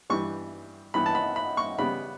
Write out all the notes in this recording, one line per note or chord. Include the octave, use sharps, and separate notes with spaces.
G2 E3 G3 C#6
G2 E3 B3 B5
A5
B5
B5
C#6
C#3 G3 B3 B5